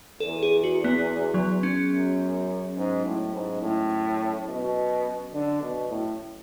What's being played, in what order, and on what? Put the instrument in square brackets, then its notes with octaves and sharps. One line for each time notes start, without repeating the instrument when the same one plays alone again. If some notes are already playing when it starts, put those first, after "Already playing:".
[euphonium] E2 [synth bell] A4
[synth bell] G#4
F#4
B3
F#3
C#4
[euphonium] F#2
G#2
A2
G#2
A2
B2
D3
B2
A2